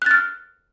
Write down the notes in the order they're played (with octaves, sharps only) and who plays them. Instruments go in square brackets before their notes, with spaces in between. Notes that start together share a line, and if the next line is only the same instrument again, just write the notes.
[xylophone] F#6
A6
F6